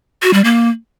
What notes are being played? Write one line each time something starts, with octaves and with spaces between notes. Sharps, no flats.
F#4
G3
A#3